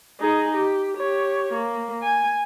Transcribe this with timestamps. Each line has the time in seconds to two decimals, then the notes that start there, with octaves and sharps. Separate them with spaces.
0.21 D#4 G#4
0.56 G4
0.97 G4 C#5
1.53 A#3
2.03 G#5